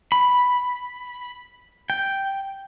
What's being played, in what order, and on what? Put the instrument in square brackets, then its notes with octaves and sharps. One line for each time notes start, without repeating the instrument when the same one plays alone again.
[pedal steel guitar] B5
G5